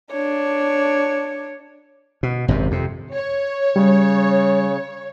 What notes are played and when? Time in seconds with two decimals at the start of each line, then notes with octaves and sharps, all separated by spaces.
0.11 D4 C#5
2.23 B2
2.48 G#1 F#2 A2 C3
2.71 F2 C3
3.13 C#5
3.76 C#3 G3